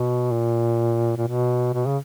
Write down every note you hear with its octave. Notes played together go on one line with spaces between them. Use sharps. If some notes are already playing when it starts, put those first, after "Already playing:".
Already playing: B2
A#2
A#2
B2
B2
C#3